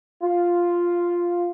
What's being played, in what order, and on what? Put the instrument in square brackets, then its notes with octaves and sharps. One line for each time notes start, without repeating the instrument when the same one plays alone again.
[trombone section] F4